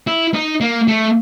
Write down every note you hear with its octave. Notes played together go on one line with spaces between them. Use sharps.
E4
D#4
A#3
A3